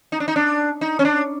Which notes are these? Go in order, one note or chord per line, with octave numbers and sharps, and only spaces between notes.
D#4
D4
D#4
D4
D#4
C#4
D4